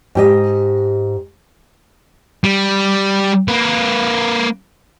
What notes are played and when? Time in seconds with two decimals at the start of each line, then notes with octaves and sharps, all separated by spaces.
0.15 G#2 G4 D#5
2.44 G3
3.48 A#3 B4